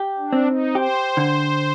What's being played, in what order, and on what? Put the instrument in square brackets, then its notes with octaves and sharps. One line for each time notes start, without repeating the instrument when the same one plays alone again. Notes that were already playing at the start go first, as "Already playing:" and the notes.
Already playing: [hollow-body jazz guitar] G4
[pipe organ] D4
[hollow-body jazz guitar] C4
[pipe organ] D#4
[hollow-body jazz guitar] G4 [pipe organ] C5
[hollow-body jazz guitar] D3